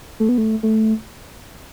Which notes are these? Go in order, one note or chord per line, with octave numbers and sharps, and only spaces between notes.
A3
B3
A3
A3